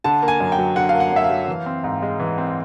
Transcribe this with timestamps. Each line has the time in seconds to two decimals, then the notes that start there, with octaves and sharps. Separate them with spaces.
0.04 D3 A5
0.22 A#3
0.28 G#5
0.40 F#2
0.52 G5
0.58 F#3
0.76 D3 F#5
0.89 F5
0.94 A#3
1.00 F#5
1.12 F#2 E5
1.24 F5
1.30 F#3
1.48 E3
1.66 C4
1.84 G#2
2.02 G#3
2.20 E3
2.38 C4